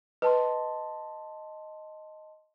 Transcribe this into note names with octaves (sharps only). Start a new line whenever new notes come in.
B4 D#5 A5 C6